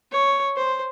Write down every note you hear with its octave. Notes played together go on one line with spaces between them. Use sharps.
C#5
C5